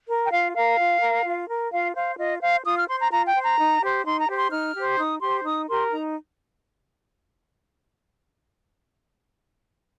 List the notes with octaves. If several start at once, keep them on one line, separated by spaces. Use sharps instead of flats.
A#4
G5
F4 F5
A#4 F5
F4
A#4
F4
A#4
F4 F5
C5 F5
F4 D#5
C5 F5
F4 D#6
F6
C5 C6
A#5
F4 A#5
G5
C5
A#5
D#4
G4 C5
D#4 C6
A#5
G4 C5
C6
D#4 F6
G4 C5
D#4 D#6
G4 C5 C6
D#4 D#6
G4 A#4 C6
D#4 A#5